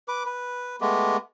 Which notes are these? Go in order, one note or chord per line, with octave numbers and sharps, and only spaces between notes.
B4 D6
B4
G#3 A3 B3 G4